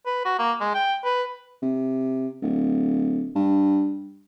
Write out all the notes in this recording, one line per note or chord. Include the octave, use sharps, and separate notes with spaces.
B4
F#4
A#3
G#3
G5
B4
C3
D1
G2